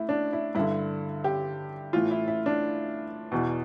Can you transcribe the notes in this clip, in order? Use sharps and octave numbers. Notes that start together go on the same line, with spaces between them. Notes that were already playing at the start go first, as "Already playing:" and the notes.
Already playing: A2 E4
D4
E4
G2 D3 E4
G4
A2 E3 F4
E4
E4
D4
E2 B2